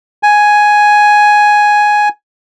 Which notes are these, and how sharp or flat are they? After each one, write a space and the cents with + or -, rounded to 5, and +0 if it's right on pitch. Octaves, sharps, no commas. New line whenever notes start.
G#5 +5